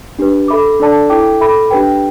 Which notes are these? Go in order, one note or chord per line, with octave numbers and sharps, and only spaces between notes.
D4 G4 B4
A4 E5 B5 D6
D4 A4 D5 A5 D6
E4 A4 G5 D6
A4 E5 B5 D6
D4 G4 B4 G5